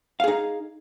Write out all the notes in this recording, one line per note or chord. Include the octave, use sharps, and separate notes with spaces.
D#4 G#4 F5